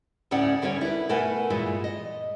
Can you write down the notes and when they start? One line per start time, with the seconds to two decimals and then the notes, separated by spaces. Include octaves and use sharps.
0.31 D2 A2 C#4 D5 F#5
0.62 D#2 D3 G3 C#4 C#5
0.81 E4 B4
1.09 B2 A3 A#4 B4 F#5 G#5
1.50 G2 A#2 E3 G#3
1.84 D#5